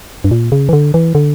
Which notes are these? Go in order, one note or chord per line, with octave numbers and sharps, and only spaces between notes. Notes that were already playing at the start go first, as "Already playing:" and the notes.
G2
A#2
C#3
E3
D3
E3
D3